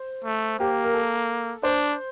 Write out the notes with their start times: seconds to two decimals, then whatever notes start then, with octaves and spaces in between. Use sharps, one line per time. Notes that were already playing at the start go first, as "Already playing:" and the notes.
Already playing: C5
0.25 A3
0.59 A#3 G4
0.84 A#4
0.94 A4
1.63 D4 C5